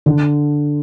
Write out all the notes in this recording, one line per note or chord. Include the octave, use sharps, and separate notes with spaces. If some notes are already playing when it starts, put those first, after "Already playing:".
D3